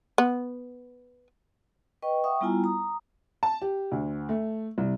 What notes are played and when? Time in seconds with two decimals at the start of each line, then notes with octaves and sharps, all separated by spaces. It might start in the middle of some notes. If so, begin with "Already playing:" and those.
0.18 B3
2.03 B4 D#5 G5 C#6
2.24 E5 F#5 G5 C#6 D#6
2.41 G3 B3 E4 F4 G#5 A#5
2.64 A#5 D#6
3.43 A5
3.62 G4
3.92 D2
4.29 A3
4.78 C2